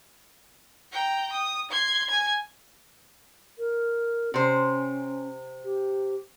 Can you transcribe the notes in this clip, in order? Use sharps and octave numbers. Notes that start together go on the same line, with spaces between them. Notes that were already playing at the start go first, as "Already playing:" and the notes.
G5 A#5
D#6
C6 G#6
G#5 G#6
A#4
C3 C#4 C5
G4